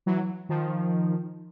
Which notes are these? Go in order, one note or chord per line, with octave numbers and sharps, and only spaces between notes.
E3 F#3
D#3 F3